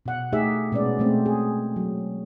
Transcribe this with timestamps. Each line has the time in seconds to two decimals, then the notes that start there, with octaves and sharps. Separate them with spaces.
0.06 B2 F#5
0.32 A3 D#4 G4 G#4 E5
0.72 B2 G#3 B3 C#4 D5
0.99 B2 G#3 A3 C4
1.26 G#4
1.76 F#3